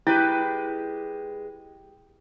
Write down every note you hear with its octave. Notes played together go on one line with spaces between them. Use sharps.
G#3 E4 G4 B4